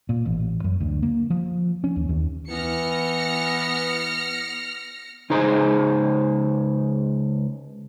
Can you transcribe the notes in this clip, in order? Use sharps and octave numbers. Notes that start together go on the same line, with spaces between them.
A#2
A1
F#2
D2
A#3
F3
C#4
D#2
D#2
E3 B3 F6 A#6 C#7
C#2 D#4 G#4 C5 A#5 C6